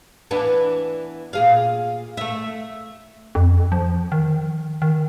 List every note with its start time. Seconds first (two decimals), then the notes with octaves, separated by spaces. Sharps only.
0.31 E3 B3 D4
1.33 A#2 G#4 F5
2.17 A3 E5
3.35 F2
3.72 F3
4.12 D#3
4.82 D#3